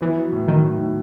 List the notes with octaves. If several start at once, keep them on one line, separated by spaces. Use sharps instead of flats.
E3 B3
F#3
A2
D#3 F#3
A2
A2